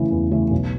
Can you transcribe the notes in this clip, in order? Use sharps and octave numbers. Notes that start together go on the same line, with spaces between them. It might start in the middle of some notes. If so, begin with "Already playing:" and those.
Already playing: C#3 E3 A3
E2
C#3 E3 A3
B1